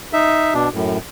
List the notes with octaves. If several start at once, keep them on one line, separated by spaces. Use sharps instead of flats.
D#4 E5
B2 D4
F#2 A2